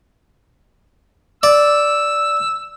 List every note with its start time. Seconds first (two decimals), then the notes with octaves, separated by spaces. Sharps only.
1.43 D5 E6